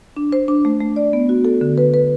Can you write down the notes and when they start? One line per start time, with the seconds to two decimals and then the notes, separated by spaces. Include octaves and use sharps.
0.17 D4
0.32 C5
0.48 D4
0.65 A3
0.80 A3
0.96 D5
1.13 B3
1.29 F#4
1.45 A4
1.61 D3
1.78 B4
1.94 B4